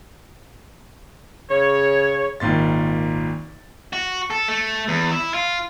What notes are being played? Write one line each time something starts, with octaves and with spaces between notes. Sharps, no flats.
C#3 C#5
G#1 A#2 C6 A6
F#4
A4
A3
E2
E4
F4